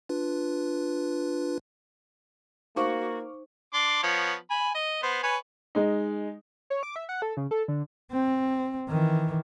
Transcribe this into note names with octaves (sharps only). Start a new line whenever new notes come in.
D4 F4 B4
A#3 D#4 F#4 C5 F5 C#6 D6
D4 C6 D6
F3 B3 C#5
G#5 B5
D#5
B3 C5
B4 C#5 G#5
G#3 D#4
C#5
D6
E5
F#5
A4
C#3
A4
D3
C4
D#3 E3